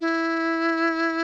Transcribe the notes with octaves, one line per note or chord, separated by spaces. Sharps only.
E4